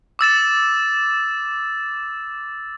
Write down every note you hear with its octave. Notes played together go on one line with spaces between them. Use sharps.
D6 E6 A6 E7